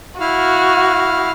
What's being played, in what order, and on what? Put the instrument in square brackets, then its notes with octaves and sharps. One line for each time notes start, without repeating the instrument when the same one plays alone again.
[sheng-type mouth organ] E4 F5 F6 [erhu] F#4